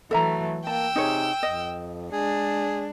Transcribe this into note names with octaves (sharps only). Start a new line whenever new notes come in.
E3 F#3 A3 A4 E5 A#5
A#3 G5 A5 E6
C3 D#4 G#4 C#5
F2 D#5
G#3 D4 G#4